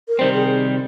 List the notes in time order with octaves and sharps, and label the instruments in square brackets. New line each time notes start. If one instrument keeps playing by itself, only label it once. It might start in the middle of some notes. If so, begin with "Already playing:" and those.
[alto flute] A#4
[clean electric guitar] C3 D#3 G3 C4 [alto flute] C5
[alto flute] G#4